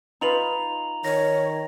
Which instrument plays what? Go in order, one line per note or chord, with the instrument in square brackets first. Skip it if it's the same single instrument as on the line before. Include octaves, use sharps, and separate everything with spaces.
[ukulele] D#4 F4 B4 [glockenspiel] A#5 F7 F#7
[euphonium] D#3 [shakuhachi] C#5 [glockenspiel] A#6